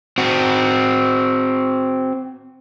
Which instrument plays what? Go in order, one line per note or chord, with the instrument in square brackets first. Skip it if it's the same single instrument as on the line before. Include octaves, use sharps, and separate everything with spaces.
[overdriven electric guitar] C4 F#4